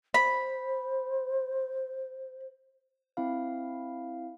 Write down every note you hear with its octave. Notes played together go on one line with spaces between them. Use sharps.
C5 B5
C4 E4 F5